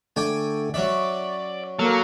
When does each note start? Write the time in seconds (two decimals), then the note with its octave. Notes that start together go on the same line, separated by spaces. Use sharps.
0.16 D3 A3 D5 G5 G#5
0.74 F#3 C#4 D5 E5
1.79 F#3 A#3 A4 F6